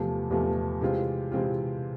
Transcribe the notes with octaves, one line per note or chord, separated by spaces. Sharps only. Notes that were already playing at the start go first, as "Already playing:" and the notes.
Already playing: E2 C3 F3 A3
E2 C3 F3 A3
C3 E3 G#3 C4 F4
C3 E3 G#3 C4 F4